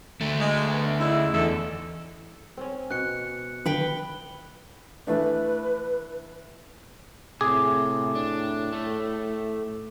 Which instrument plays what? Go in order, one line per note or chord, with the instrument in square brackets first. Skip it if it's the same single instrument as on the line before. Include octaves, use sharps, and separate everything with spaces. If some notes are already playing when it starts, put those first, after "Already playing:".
[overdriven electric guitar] D2 A3
[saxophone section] G#3
B3
C#3 D#4 E4
[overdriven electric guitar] E2 [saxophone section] D3 G#3 A4
[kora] C4 C#4
[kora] B2 [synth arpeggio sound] C4 [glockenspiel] F#6 C#7
[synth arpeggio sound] D3 D#3 D4 [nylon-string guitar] B4 G5 [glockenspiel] B5 G7
[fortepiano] E3 A3 D4 [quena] B4
[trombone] A2 [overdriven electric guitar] C3 [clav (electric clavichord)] G#4 [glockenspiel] D6
[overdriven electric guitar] D4
A3